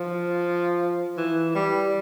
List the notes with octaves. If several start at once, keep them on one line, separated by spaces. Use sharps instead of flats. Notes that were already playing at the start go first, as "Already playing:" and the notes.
Already playing: F3
E3
G3